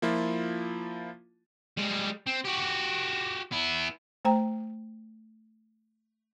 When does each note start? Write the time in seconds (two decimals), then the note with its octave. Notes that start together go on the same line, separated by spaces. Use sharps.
0.02 F3 A#3 E4 F4
1.77 G3 G#3
2.26 C4
2.44 F#4 G4
3.52 B3 E4
4.25 A3 C5 G5 A#5